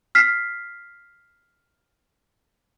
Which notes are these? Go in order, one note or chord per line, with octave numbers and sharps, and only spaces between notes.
F6 B6 C7